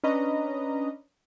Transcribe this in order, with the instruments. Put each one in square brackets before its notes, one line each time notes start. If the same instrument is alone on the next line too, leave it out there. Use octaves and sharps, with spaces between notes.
[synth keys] C#4 D4 B4 D#5 A#5